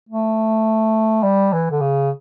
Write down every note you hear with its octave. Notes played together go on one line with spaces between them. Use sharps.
A3
G3
E3
D3
C#3